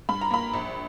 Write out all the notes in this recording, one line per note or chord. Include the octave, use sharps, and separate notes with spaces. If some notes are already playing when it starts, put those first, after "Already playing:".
G2 B5
A#5
A#3 B5
A#1